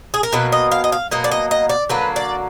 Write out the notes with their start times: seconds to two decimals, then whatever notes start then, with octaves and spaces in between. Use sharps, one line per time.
0.14 G#4
0.23 A#4
0.32 B2 F#3 A#3 B4
0.52 D#5
0.72 F5
0.84 D#5
0.92 F5
1.11 B2 F#3 A#3 D#5
1.24 D5
1.31 D#5
1.51 D#5
1.69 D5
1.90 D3 F#3 A#3 B4
2.16 D5